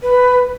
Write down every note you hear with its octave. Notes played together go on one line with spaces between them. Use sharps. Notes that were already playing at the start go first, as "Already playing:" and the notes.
B4